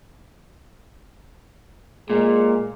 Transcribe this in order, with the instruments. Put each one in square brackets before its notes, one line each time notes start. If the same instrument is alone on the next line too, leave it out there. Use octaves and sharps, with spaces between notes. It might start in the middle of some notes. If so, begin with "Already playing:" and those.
[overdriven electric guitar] A#2 [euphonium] G#3